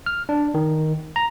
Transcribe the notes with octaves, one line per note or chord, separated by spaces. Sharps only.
F6
D4
D#3
A#5